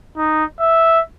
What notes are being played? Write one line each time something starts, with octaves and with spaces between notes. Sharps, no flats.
D#4
E5